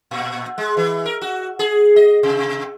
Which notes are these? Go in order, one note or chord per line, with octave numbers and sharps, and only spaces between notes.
A#2
G#3
E3
A#4
F#4
G#4
D#5
C3